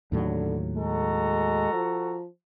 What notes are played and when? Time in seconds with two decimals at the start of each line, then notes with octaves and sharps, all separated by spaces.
0.12 D#2 A2 D3 F#3
0.77 G#3 F#4 A4 A#5
1.73 F3